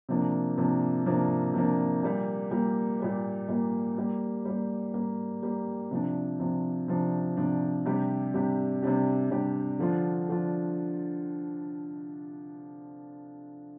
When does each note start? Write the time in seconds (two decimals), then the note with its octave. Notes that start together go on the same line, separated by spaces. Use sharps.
0.09 C3 F3 A#3 D4
0.57 C3 F3 A#3 D4
1.06 C3 F3 A#3 D4
1.54 C3 F3 A#3 D4
2.03 A#2 G3 A#3
2.51 A#2 G3 A#3
3.00 A#2 G3 A#3
3.48 A#2 G3 A#3
3.98 G3 A#3 G4
4.45 G3 A#3 G4
4.94 G3 A#3 G4
5.43 G3 A#3 G4
5.91 C3 F3 D4
6.40 C3 F3 D4
6.88 C3 F3 D4
7.37 C3 F3 D4
7.85 C3 G3 D4 G4
8.34 C3 G3 D4 G4
8.83 C3 G3 D4 G4
9.31 C3 G3 D4 G4
9.79 D3 F3 D4 F4
10.29 D3 F3 D4 F4